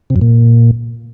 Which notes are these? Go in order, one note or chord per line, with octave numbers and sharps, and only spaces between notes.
C3
F#2
A#2